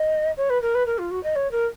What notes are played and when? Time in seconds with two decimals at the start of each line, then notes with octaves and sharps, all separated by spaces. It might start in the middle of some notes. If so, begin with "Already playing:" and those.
Already playing: D#5
0.37 C#5
0.49 B4
0.62 A#4
0.74 B4
0.86 A#4
0.98 F4
1.11 F#4
1.23 D#5
1.35 C#5
1.51 A#4